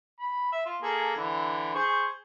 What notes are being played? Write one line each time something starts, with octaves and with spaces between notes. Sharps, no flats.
B5
E5
F4
A#3 G#4 A4
D3 E3
G#4 C5 C#6